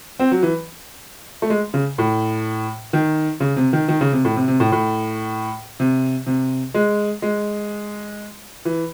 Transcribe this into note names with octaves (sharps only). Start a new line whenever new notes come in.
C4
F#3
E3
A3
G#3
C#3
A2
D#3
C#3
C3
D#3
D#3
C#3
C3
A2
C3
C3
A2
A2
C3
C3
G#3
G#3
E3